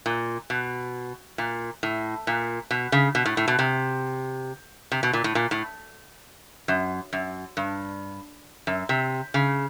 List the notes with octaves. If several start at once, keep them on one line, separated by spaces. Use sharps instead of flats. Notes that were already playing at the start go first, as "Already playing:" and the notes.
A#2
B2
A#2
A2
A#2
B2
C#3
B2
A2
A2
B2
C3
C3
B2
A#2
A2
A#2
A2
F#2
F#2
G2
F#2
C3
C#3